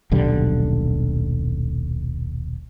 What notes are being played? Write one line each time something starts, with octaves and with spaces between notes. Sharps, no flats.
D#1 B1 D3 G3